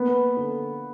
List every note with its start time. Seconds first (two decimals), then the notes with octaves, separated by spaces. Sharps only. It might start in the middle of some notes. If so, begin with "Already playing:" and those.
Already playing: A#3 B3 B4
0.37 D3